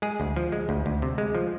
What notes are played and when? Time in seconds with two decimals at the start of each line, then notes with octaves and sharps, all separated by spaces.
0.02 G#3 G#4
0.20 D2
0.36 F3
0.52 G#3
0.69 D2
0.86 D2
1.02 C3
1.18 G#3
1.35 F3